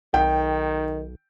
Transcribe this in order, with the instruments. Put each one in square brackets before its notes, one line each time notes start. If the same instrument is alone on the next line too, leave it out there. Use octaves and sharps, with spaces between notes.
[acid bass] B1 [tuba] D#3 [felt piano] G5